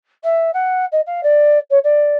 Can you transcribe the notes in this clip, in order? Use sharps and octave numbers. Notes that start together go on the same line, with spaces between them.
E5
F#5
D#5
F5
D5
C#5
D5